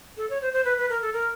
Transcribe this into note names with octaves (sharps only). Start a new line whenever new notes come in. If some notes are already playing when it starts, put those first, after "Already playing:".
A4
C#5
C5
C5
B4
B4
A#4
A4
A#4